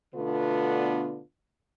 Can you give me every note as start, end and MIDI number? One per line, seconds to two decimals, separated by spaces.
0.15 1.21 47
0.15 1.21 50
0.15 1.21 57
0.15 1.21 59
0.15 1.21 62
0.15 1.21 65